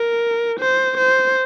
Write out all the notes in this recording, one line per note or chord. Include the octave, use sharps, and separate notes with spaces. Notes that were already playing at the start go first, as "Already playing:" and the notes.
Already playing: A#4
C5
C5